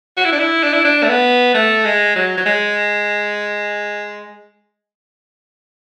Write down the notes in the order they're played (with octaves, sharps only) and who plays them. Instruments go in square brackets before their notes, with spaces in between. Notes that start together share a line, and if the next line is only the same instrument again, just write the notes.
[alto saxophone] F#4
E4
D4
E4
D4
E4
D4
A3
B3
A3
G#3
F#3
F#3
G#3